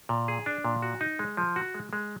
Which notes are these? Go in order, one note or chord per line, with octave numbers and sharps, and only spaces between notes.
A#2
G#4
D4
A#2
F#4
D#4
G#3
F3
F#4
G#3
G#3